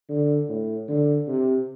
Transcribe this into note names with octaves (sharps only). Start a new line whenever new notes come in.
D3
A2
D3
C3